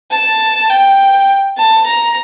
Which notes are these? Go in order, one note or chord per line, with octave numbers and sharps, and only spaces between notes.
A5
G5
A5
A#5